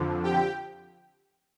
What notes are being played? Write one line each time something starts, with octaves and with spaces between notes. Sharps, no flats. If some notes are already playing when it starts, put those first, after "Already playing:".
Already playing: F2 D3 F3
G4 G5